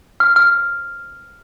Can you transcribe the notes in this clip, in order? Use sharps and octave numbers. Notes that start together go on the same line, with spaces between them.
F6
F6